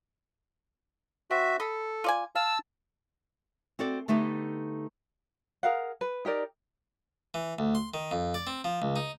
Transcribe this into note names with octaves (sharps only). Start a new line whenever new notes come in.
C4 F#4 E5
A4 D#5 B5
F4 D5 G#5
F5 A5 E6
C4 F#4 A4 D5
D3 A3 B3 D#4 G4
G#4 A#4 F5 F#5
B4
D#4 G4 A#4 D5
E3
D2
C6
D#3
F2
D5
C4
F3
C#2
D#4